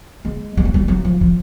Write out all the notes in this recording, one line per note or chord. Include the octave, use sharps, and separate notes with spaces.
G#3
G3
F#3
G3
F#3
F3
F3